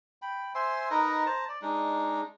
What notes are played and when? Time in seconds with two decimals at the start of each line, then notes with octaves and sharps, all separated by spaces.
0.22 G5 B5
0.55 C5 E5 G#5 C6
0.91 D#4 A#4 B4 D#5
1.26 C5 A5 A#5
1.48 D5
1.62 G#3 D4 D#4